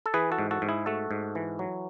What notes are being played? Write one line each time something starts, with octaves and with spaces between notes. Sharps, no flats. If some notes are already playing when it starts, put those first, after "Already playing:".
A4
E3 G#4 B4
F#4 A4
G#2
F#4 A4
G#2
E4 G#4
A3 F#4 A4
G#2
E3
F#3